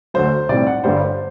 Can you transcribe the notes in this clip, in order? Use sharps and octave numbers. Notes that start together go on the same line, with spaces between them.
D2 D3 F#3 C5
B1 A2 G3 C4 D5
F#5
G1 G2 D3 G3 B3 C5